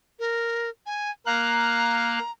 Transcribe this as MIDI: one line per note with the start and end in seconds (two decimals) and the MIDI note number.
0.19 0.70 70
0.86 1.11 80
1.26 2.19 58
1.26 2.19 77
1.26 2.32 82
1.26 2.19 90